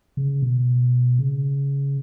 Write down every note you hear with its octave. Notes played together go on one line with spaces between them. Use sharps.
C#3
B2
C#3